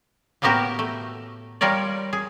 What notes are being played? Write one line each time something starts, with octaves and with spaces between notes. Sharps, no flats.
A2 A#3 B3 F#4 G4 A#4
A3
G3 F4 A#4 C#5 D5
G#4